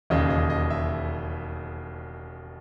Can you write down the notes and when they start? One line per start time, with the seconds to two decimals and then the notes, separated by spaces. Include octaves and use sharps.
0.10 E1 D#2 C#3 D#5
0.30 D#5
0.50 D#5
0.70 E5